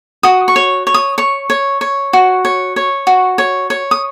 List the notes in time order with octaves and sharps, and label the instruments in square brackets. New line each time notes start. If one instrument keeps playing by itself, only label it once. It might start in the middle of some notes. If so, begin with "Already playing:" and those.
[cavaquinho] F#4 D#6
C#6
C#5
C#5
D#6
C#5 C#6
C#5
C#5
F#4
C#5
C#5
F#4
C#5
C#5
D#6